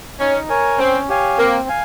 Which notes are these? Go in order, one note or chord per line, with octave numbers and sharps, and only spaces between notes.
C#4 D#4
A#4 C#5 G#5
C4 C#4
G4 C#5 F5 G#5
A#3 C4
F5 G#5